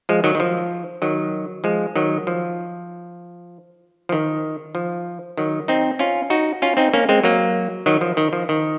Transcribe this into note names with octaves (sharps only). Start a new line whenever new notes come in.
F3 G#3
D#3 F#3
D#3
F3
D#3 F#3
F3 G#3
D#3 F#3
F3
F3
D#3
F3
D#3 F#3
C4 D#4
C#4 F4
D#4 F#4
C#4 F4
C4 D#4
A#3 C#4
G#3 C4
F#3 A#3
D#3 F#3
F3
D#3
F3
D#3